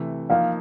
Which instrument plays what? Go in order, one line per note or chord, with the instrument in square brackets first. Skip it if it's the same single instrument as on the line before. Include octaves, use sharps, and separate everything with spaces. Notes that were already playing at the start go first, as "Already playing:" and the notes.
Already playing: [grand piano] C3 E3 A3
[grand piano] F3 A#3 D#4 [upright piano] F5